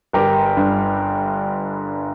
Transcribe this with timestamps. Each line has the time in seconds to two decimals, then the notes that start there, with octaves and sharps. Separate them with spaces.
0.13 G1 G4 A#4
0.57 G2